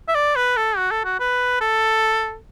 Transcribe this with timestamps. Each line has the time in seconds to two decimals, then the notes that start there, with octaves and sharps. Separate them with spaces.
0.08 E5
0.15 D5
0.36 B4
0.56 A4
0.77 F#4
0.91 A4
1.04 F#4
1.19 B4
1.61 A4